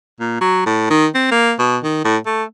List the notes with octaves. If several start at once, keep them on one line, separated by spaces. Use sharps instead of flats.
A#2
F#3
A2
D#3
C4
A#3
B2
D#3
A2
A3